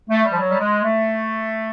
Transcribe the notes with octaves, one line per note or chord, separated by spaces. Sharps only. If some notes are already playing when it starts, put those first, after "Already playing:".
A3
G3
F3
F#3
G3
G#3
A3